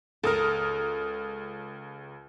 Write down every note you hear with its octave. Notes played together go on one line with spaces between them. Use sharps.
C#2 A4 A#4 D#6 F6